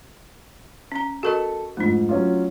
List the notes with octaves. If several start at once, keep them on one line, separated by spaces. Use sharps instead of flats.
C#4 A#5
F#4 A4 A#4 D#5 C#6
F2 G#2 F3 A3 D4
F#3 C#4 F4